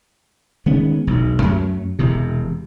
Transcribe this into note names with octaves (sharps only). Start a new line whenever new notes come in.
D#3 G#3 B3 C#4
E1 B1
F#2 F#3 A3
E1 E2 C3